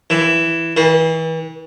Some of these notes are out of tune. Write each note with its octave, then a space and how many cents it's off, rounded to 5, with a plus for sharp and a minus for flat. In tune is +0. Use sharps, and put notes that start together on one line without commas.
E3 +5
E3 -35